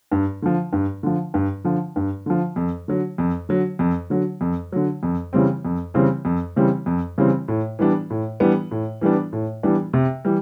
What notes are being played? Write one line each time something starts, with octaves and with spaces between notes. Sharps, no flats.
G2
D3 F3
G2
D3 F3
G2
D3 F3
G2
D3 F3
F2
D3 F#3
F2
D3 F#3
F2
D3 F#3
F2
D3 F#3
F2
C#3 E3 G3 C4
F2
C#3 E3 G3 C4
F2
C#3 E3 G3 C4
F2
C#3 E3 G3 C4
A2
E3 G3 B3 D4
A2
E3 G3 B3 D4
A2
E3 G3 B3 D4
A2
E3 G3 B3 D4
C3
E3 G3